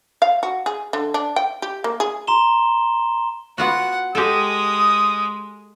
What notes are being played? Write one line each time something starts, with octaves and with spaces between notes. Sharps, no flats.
F5
F#4
G#4
D3
D4
G5
G4
A#3
G#4
A#5 C6 E7 G7
B3 F4 F#4 F#5
G#3 G4 A4 D#6